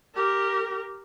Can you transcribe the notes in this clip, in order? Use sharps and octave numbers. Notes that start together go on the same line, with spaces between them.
G4 A#4